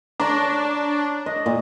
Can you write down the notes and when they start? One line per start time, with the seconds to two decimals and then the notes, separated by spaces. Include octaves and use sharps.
0.20 D4 C#5 A#5
1.26 D#5
1.46 A#2